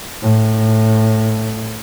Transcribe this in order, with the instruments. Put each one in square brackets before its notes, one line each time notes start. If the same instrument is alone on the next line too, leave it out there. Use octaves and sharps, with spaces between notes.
[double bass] A2